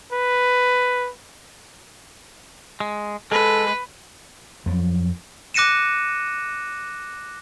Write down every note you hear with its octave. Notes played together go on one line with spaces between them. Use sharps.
B4
G#3
G#3 A4 B4
F2 F3 F#3
D6 F#6 A#6 C#7 D#7 E7